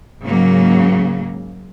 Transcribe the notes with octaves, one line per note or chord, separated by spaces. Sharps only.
G#2 C#3 F#3 A#3